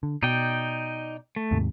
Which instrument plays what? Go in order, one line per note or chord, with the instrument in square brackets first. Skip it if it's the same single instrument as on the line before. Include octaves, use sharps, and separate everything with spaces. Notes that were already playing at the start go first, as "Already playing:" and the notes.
[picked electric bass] D3
[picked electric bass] B2 [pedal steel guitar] D#4 D5 G5
[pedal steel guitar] A3
[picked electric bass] D#2 G#2 C3